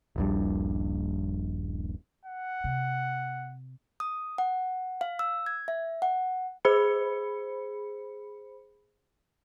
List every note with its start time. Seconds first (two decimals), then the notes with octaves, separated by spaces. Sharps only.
0.16 D#1 A#1 G2
2.25 F#5
2.64 C3
4.00 D#6
4.38 F#5
5.01 F5
5.19 E6
5.46 G#6
5.68 E5
6.02 F#5
6.65 G#4 C5 B5 C#7